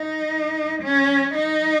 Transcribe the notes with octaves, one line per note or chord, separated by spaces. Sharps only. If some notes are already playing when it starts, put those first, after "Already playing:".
Already playing: D#4
C#4
D#4